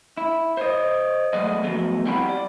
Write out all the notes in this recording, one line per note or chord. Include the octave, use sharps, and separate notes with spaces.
E4
C5 C#5 D#5
F#3 G#3 A3 B3 D5 D#5
F3 F#3 A3 B3
G3 C4 E4 G4 F#5 B5
D5